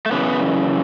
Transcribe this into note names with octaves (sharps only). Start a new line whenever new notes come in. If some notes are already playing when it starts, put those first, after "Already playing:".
A3
F#2 C#3 E3 B3